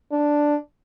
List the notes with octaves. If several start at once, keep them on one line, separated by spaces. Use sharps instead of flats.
D4